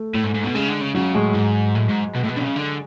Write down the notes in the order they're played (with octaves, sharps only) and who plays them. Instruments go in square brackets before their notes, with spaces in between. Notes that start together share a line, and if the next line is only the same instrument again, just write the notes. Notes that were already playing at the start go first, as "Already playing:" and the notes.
Already playing: [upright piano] A3
[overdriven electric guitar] A2
G#2
G#2
B2
[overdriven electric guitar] C#3 [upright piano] G#3
[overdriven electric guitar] D3
C#3
[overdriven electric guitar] C#3 [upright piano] F#3
[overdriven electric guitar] A2 [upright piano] G#3
[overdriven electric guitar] G#2
A2
G#2
B2
A2
B2
D3
C#3
D3